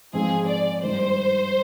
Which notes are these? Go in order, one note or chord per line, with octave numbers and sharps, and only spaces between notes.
G#2 F3 C4 F4 G#4
D5
G2 D#3 G#3 C5